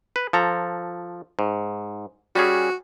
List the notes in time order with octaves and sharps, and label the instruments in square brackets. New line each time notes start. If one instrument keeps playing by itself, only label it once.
[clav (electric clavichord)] B4
F3 A4 A#5
G#2
[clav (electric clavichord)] G3 C#4 G#4 [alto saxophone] F#4